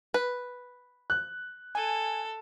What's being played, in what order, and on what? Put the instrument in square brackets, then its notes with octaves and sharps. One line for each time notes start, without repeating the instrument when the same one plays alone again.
[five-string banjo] B4
[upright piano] F#6
[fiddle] A4 [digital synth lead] G#5